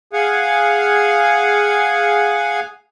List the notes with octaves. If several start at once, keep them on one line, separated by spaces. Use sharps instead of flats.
G#4 F5 F#5 G#5